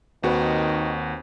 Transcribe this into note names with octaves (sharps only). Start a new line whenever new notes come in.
D#2 D#3 C4 D#4 F#4 B4